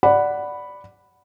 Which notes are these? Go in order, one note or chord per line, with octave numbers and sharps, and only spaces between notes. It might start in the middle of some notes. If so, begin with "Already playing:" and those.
D5 F#5 B5